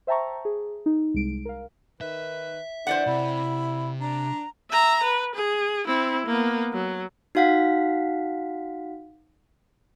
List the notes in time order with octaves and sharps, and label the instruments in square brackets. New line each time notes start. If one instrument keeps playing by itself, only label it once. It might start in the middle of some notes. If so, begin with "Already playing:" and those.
[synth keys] C5 E5 G5 A5 A#5 C#6
G#4
D#4
C2 G#3 D7
A#4 F5
[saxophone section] D#3 B4 [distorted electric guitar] E5
[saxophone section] E3 D4 [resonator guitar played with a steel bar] C5 D5 F#5
[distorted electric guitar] C3 [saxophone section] E4 [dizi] B5
[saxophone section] D4 [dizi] A#5
[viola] E5 A#5
B4
G#4
C4 E4
A#3 B3
F#3
[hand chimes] D#4 F#4 F5 F#5 B6